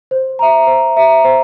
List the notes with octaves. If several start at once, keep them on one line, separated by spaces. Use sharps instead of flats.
C5
E5 A#5
C5
E5 A#5
C5